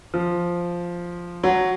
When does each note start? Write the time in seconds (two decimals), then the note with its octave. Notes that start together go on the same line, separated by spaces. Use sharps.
0.14 F3
1.44 F#3